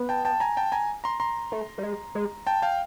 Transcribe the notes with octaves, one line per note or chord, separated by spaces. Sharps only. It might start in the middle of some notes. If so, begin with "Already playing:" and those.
Already playing: B3
G5 A5
G5 A5
G#5 A#5
G5 A5
G#5 A#5
A#5 C6
A#5 C6
A3
G3
G#3
G#3
G5 A5
F5 G5